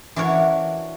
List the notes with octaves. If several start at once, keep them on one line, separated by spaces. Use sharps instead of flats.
E3 D4 F#4 A#4 C#5